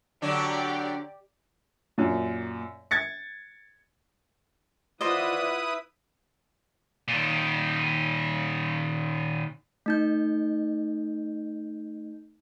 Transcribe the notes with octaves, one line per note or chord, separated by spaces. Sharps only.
D3 F#3 D4 G4 D5
F#2 A#2
G#6 A6 C#7
E4 F4 B4 C5 D5 D#5 F#5 D#6
A#2 D#3
A3 D#4 G6